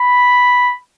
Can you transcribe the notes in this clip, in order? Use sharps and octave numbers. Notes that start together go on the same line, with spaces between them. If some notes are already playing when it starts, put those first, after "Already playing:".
Already playing: B5